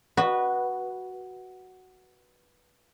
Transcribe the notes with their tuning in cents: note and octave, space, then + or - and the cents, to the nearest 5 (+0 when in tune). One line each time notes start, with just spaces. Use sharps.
F#4 +5 B4 -15 D#5 -25